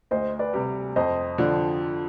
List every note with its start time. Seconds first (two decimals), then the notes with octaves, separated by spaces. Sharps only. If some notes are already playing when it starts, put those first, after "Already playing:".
0.11 D2 C5 D#5
0.39 B4 D5
0.53 C3 G3
0.96 F2 C5 D#5
1.38 D3 F3